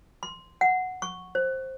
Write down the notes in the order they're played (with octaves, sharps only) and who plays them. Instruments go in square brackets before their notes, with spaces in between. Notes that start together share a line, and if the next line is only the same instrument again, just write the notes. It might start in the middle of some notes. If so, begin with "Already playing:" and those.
[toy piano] C6
F#5
C#6
C5